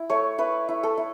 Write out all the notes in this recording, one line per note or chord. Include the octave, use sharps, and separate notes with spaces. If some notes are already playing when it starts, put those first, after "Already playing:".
Already playing: E4
A3 C#5
E4 B4
E4
A4
E4